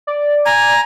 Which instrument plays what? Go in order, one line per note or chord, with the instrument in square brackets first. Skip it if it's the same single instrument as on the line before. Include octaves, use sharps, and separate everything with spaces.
[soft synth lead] D5
[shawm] G#5 [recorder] A#5